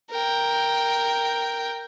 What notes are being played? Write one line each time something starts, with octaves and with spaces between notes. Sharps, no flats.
A#4 G5